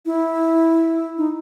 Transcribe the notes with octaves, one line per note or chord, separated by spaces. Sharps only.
E4
D#4